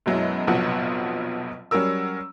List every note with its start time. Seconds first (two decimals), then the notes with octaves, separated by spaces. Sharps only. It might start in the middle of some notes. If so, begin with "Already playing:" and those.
0.06 F#2 B2 F#3 G#3 E4
0.47 F1 A#1 B2 F3 F#3 F#5
1.71 F#3 G3 C#4 A#4 E6